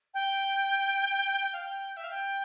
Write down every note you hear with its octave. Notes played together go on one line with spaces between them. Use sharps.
G5
F5
G5
E5
F5
G5